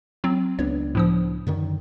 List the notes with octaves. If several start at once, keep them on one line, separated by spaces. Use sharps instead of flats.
F#3 C4 F4
C#2 B3 D4 C#5
A2 F3 D#6
F#2 D3 D#3